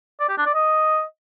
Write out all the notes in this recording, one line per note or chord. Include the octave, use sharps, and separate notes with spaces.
D5
G4
D4
D5
D#5